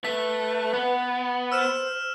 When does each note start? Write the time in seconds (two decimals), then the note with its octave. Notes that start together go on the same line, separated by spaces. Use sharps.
0.05 A3 B4 B6
0.74 B3
1.52 C5 E6 F6 E7